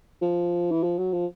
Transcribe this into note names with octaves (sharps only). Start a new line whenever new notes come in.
F3
E3
F3
F#3
F3